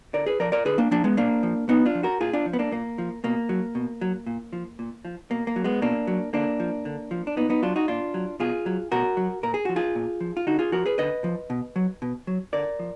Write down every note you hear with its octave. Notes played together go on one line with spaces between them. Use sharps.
D3 A#4 D5
G#4 B4
F3 A#4 D5
A#4 D5
D3 G#4 B4
A#3 D4
F3 A#3 D4
G#3 B3
A#2 A#3 D4
F3
A#2 B3 D#4
D4 F4
F3
F#4 A#4
A#2 F4 G#4
D4 F4
F3
B3
A#3 D4
A#2 A#3
F3
B2 A#3
F#3
B2
F#3
A#2
F3
A#2
F3
B2 A#3
A#3
F#3
G#3 B3
B2 A#3 D4
F#3
D3 A#3 D4
F3
D3
F3
D4
A#2 B3 D#4
B3 D#4
F#3 D4 F4
D#4 F#4
A#2 D4 F4
F#3
B2 F4 G#4
F#3
B2 F#4 A#4
F#3
A#2 A#4
G#4
F3 F#4
F4 G#4
A#2
F3
F4
D3 D#4 F#4
F4 G#4
F3 F#4 A#4
G#4 B4
D3 B4 D#5
F3
B2
F#3
B2
F#3
D3 A#4 D5
F3